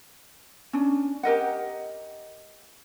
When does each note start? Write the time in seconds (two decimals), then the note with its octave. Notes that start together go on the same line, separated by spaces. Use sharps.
0.73 C#4 D4
1.23 G4 A#4 D#5 F#5